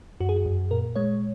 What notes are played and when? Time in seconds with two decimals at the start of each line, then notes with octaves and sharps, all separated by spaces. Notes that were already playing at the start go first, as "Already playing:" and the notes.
0.20 F#2 F#4
0.29 G#4
0.36 F#4
0.46 F#2
0.71 A#2 A#4
0.96 G#3 C#5